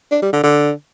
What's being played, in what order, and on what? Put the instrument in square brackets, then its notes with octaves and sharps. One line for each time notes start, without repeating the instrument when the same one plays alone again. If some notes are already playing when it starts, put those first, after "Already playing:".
[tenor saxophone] D4
G3
D3
D3